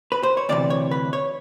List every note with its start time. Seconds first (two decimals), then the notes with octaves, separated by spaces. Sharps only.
0.12 B4
0.23 C5
0.37 C#5
0.49 D2 C3 E3 D5
0.70 C#5
0.91 B4
1.13 C#5